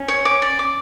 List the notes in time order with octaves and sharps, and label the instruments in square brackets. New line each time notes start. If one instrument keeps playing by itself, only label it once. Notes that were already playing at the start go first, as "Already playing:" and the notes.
Already playing: [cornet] C#4
[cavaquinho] C#5
D6
D5
D6